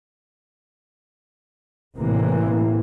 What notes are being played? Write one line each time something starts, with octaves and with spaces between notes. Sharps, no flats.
A1 A2 C3 E3 A#3